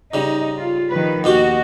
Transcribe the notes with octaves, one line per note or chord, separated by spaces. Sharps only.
C#3 G3 D#4
F4
D#3 F3 B4
D#2 B2 F#4 G4